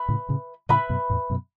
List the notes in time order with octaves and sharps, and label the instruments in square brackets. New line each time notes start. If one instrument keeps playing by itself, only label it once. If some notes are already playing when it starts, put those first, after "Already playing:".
Already playing: [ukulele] B4 E5 B5
[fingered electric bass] A2 C#3
A2 C#3
[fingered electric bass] A2 C#3 [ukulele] B4 E5 B5
[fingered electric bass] F#2 B2
E2 A2
F#2 B2